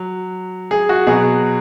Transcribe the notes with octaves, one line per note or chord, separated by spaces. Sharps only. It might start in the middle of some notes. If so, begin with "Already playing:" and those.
Already playing: F#3
G#4
F#4
B2 F#3 G#4